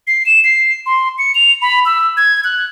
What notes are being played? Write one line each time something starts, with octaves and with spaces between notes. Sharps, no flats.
C7
E7
C7
C6
C#7
F7
B5
E6
G#6
F#6